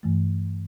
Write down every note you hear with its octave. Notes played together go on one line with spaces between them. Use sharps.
G2 E3 A3